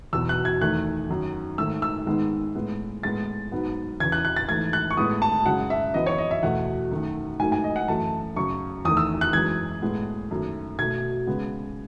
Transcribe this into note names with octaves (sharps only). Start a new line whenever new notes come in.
E2 B2 F#3 B3 E6
F#6
G#6
E2 D#3 A3 F#6
F#2 D#3 F#3
G#2 D#3 A3 E6
E6
G#2 D#3 G#3 B3
A2 G#3 B3
A2 G#3 B3 A6
G#2 F#3 B3
E2 C#3 E3 G#6
F#6
F#6
A6
G#2 E3 A3 G#6
F#6
C#6
A2 G#3 B3 D#6
A5
F#2 C#3 G#3 F#5
E5
F#2 E3 B3 D#5
C#5
D#5
E5
E2 B2 A3 F#5
F#2 D#3 A3
G#2 F#3 A3 G#5
G#5
D#5
F#5
F#2 E3 A3 A5
F#2 C#3 F#3 C#6
E2 D#3 A3 D#6
E6
F#6
F#2 E3 G#3 G#6
A2 G#3 B3
F#2 D#3 A3
B2 A3 G#6
C#3 G#3 B3